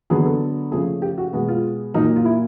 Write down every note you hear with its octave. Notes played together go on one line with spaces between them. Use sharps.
D3 F#3 B3 G#4
A4
C#3 F3 A3 G#4
G4
F#4
B2 G#3 B3 F#4
F4
A#2 F#3 A#3 D#4
F4
E4